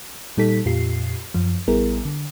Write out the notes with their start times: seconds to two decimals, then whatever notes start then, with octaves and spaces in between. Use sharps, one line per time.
0.37 A#2 G3 D#4 G4 A4 B6
0.65 F2 A#2 F4 G4 C7
1.34 F#2 F3
1.68 A1 G3 B3 E4 G#4 A#4
2.05 D3